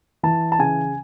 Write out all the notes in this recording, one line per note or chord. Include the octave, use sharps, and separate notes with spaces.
E3 A5
A5
C#3 G#5